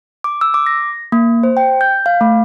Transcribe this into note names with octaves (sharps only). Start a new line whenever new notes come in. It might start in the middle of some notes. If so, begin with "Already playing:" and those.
D6
E6
D6
A#6
A#3
C5
G5
G6
F5
A3